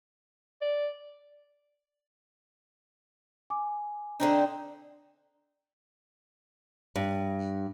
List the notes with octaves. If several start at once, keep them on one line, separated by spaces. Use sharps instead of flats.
D5
G#5 D6
D3 C4 D4 D#4 A#5
G2